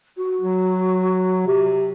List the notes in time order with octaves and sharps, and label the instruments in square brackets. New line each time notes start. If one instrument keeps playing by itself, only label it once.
[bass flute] F#4
[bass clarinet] F#3
C3